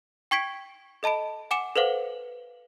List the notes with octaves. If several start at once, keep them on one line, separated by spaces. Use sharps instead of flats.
G5 C#6 G#6 B6 D7
A4 D#5 A5 B5 D7
F#5 G#5 D6 C#7 E7
A4 B4 C5 F5 F#5